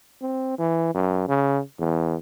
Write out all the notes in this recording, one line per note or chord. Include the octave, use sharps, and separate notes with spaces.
C4
E3
F#2
C#3
E2